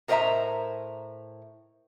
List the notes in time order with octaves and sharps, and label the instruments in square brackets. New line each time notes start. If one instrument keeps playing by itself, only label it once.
[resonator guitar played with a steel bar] A2 A#4 C5 D#5 E5 A#5